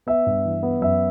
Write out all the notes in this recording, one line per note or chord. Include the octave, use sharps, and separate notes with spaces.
B3 E5
G2
E3
B3
F#2 E5